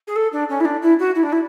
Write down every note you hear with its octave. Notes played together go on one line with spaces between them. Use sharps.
G#4
A4
D4
C#4
E4
D4
E4
F#4
E4
D4
E4